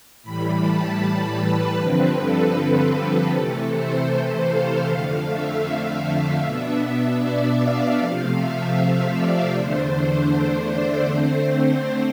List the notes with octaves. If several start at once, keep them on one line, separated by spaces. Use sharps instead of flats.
A2 E3 G3 B5
A5
B4
G2 D3 F3 C4
A4
A4
C3 E3 A3
C5
F5
F2 D3 A3
E5
F5
E5
B2 B3 D4 E5
D5
F5
C3 F3 A3
E5
D5
E2 D3 A3 D4 C5
C5
D5
D3 A3 C4 C5